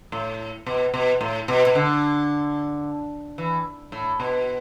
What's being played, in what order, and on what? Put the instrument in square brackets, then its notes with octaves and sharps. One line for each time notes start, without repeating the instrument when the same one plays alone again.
[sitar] A2
B2
B2
A2
B2
B2
D3
E3
A2
B2